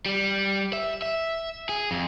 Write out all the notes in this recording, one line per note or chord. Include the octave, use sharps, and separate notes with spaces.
G3
E5
E5
G#4
F2